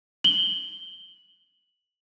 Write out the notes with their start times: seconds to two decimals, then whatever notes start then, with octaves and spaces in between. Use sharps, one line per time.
0.24 F#7 G7